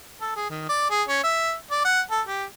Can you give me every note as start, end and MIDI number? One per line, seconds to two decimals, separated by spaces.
0.21 0.33 69
0.36 0.50 68
0.50 0.65 51
0.69 0.85 74
0.90 1.02 68
1.08 1.23 61
1.23 1.53 76
1.71 1.84 74
1.85 2.01 78
2.11 2.21 69
2.27 2.44 67